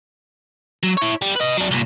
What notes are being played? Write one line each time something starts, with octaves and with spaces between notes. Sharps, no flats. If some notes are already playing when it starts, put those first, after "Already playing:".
F#3
E4 C#5
G3
B4 D#5
F#3 D4
C2 A#2